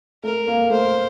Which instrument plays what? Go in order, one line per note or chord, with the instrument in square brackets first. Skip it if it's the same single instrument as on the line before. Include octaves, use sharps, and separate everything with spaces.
[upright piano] A3 [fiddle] A#4
[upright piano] A#3
[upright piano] A3 [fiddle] C5